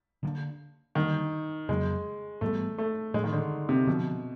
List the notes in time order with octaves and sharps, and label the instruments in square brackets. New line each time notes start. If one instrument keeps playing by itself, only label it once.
[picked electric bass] D3 F3 A#3 D4
[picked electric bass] D3 G3 A#3 D4 [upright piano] D#3
[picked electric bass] F2 C#3 F#3 A#3 [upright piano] G#3
[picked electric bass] G#2 E3 G3 B3 [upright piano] A3
[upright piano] A3
[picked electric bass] A2 F3 A3 D4 [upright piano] G#3
[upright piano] D#3
D3
C3
[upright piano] B2 [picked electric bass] D3 F3 A3 D4